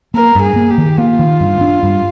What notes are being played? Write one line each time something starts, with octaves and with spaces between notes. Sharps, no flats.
A#3 A#4
G2
G#4
A#3
G4
D#3
A#3 F4
D#3
G2
D4
G2